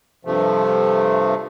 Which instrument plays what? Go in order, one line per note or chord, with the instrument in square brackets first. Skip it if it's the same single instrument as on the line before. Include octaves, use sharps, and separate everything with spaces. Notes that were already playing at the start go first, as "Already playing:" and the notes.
[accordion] G2 C3 F3 A3